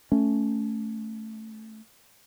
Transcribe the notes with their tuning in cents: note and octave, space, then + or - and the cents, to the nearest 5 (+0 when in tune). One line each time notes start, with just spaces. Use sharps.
A3 +0 C#4 +5